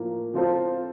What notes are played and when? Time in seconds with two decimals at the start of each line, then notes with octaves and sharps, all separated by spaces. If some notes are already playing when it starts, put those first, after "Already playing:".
Already playing: A2 F3 A#3
0.34 F3 C4 F4 A4 C5